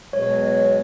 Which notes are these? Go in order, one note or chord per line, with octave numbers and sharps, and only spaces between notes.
B2 F#3 G#3 C#5